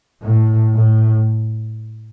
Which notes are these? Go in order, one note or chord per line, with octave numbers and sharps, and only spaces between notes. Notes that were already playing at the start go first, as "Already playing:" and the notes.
A2
A2